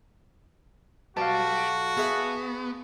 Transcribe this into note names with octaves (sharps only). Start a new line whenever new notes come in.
B1 F#4 G4 D5 F5 A5
B3 G#4 E5